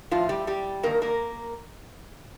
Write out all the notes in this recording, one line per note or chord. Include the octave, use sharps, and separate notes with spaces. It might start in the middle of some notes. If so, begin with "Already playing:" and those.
A2 F3 F4
G3 G4
G3 G4
G2 D#3 A#3 A#4
A#3 A#4